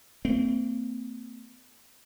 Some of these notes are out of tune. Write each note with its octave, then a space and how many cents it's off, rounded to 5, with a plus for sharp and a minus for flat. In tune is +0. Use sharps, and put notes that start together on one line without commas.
A3 +45 C4 -35